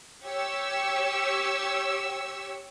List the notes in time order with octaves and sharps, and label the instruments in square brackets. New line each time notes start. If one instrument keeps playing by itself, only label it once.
[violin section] G4 C#5 C#6 E6